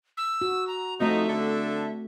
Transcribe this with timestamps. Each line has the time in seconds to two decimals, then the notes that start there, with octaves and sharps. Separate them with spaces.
0.17 E6
0.41 F#4
0.68 A#5
1.00 F3 A3 C4 D#4 F#4 E5
1.28 D3 A4